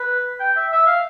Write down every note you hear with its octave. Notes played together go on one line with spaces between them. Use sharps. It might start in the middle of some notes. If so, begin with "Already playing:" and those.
Already playing: B4
G5
E5
E5
F5